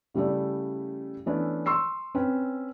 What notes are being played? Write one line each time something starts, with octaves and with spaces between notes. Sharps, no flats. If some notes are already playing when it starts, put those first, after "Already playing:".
C#3 G3 A3 E4 D5
E3 A3 B3 C#4 D4 E4
C6 C#6 E6 C7
C4 C#4 B4